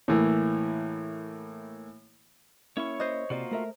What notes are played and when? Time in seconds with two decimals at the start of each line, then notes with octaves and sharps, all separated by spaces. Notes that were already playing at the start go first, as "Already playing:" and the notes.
0.08 A2 E3 A#3
2.77 A#3 C#4 E4 C#5 C#6
3.00 C5 D#5
3.30 C3 A#3 F4 F#4 D5
3.51 A3 A#4 E5